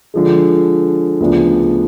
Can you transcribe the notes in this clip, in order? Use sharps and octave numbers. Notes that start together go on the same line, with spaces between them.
D3 F3 G#3
D2 C#3 F3 B3 D4